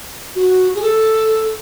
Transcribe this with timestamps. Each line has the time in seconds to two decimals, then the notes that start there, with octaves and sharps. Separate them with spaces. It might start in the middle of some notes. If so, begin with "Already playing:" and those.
0.35 F#4
0.75 G#4
0.81 A4